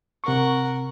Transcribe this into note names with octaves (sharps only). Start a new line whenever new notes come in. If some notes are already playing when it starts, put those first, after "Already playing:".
C3 A#4 F#5 C#6